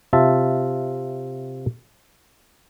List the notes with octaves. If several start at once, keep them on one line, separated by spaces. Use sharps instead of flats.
C3 F4 E5 A5